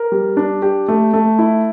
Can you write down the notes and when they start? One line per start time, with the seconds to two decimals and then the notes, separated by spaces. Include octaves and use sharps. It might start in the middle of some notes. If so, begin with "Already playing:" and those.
Already playing: A#4
0.12 G3
0.37 D4
0.62 G4
0.88 A3
1.14 A3
1.39 E4